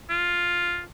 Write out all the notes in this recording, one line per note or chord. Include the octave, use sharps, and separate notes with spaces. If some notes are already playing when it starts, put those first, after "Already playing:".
F4